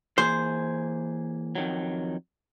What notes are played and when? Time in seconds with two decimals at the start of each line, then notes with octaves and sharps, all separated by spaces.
0.18 E3 A#3 G#4 C5
1.55 F2 D#3 F#3